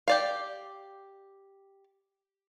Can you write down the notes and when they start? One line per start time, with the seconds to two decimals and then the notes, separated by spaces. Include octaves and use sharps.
0.08 G4 D5 F5